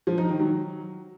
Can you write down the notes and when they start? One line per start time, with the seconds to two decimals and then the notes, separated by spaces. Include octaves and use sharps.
0.07 F3
0.18 D#4
0.29 D#3
0.39 F#3